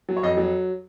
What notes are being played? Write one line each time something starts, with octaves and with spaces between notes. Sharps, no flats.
F#3
C#5
F2 D#5
F#3